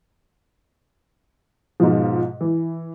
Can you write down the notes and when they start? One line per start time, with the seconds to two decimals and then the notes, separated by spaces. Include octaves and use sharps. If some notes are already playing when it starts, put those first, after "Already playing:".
1.80 G#2 B2 F3
2.41 E3